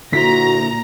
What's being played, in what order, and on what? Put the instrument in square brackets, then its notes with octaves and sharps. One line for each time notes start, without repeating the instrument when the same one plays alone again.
[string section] A#2 A#5 A#6 [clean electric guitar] D3 E4 C5 [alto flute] F#4 [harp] B6